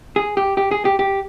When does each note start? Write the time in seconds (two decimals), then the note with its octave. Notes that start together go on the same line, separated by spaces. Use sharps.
0.16 G#4
0.37 G4
0.57 G4
0.71 G#4
0.85 G4
0.99 G4